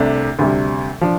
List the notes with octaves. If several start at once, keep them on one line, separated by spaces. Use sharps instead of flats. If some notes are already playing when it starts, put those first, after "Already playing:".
Already playing: C2 C3 A3 D4
D2 C3 G3
F3 D4